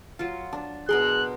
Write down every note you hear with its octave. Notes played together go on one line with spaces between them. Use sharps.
F#3 F4
D4
B2 G#4 A#4 C6 F#6